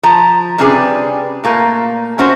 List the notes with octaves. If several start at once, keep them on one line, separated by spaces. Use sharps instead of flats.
F3 A5 A#5
C3 G3 C#4 D4 G#4 B4
A#2 A3 A#3
A3 C#4 F#4 C5